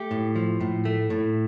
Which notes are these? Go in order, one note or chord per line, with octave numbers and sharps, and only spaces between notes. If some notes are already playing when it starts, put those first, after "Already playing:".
Already playing: A3 G4
A2
F3
A2
A3
A2